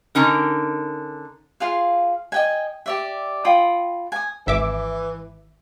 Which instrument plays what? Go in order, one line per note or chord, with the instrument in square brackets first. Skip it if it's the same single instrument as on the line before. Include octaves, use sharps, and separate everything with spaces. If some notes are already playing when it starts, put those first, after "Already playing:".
[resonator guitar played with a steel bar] D3 C#4 D#4 A#4
[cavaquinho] F4 G#4 F5
D#5 G5 G#5
G4 D5 E5
F4 G5 B5 D#6
G#5 D#6
[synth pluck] G#1 E5 D6 [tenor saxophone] E3